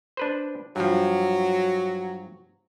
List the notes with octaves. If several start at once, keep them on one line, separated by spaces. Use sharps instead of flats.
D4 B4 C5
G2 F3 F#3